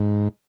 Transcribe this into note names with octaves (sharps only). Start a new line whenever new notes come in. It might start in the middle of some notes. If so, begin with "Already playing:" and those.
Already playing: G#2